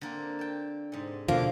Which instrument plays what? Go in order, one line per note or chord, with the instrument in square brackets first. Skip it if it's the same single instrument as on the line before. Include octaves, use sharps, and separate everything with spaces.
[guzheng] D3 A#3 C4
G5 A5
G#2 C3
[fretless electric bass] B2 D3 F3 [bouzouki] A#3